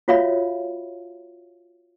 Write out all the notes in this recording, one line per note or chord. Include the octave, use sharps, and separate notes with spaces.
F4 F#4 C#5 E5 F5 B5